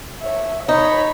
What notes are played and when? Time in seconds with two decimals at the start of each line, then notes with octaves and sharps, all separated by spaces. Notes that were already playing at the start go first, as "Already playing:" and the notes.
0.21 C#5 E5
0.69 D#4 C#5 B5